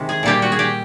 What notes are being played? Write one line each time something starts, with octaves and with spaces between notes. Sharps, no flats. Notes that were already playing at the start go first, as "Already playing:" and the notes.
Already playing: C3 D#3 G#3
G#4
A#2 G3 A#3 G4
F#4
G#4
G4